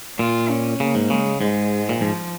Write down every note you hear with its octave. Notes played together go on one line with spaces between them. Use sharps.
A#2 F4
C#4
C#3 A#3
G#2
C#3 G#3
G#2 G#3
A#2
G#2 F3